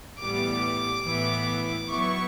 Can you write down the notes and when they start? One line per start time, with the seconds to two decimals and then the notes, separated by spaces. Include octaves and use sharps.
0.19 A2 E3 G3 B3 D6
1.04 A2 E3 B3 E4
1.89 F#3 B3 E4 C#6